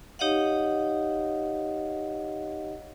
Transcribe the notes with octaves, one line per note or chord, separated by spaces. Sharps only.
D#4 G4 C#5 D#5 F5 F#5